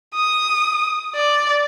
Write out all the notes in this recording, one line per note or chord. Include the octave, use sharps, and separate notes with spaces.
D#6
D5